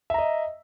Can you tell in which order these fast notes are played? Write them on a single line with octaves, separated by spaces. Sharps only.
E5 A#5 D#5